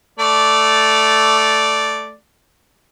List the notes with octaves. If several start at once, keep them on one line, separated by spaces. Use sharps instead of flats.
A3 D5